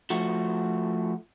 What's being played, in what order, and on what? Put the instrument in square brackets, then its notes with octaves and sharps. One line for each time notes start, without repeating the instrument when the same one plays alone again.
[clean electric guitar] F3 A3 F#4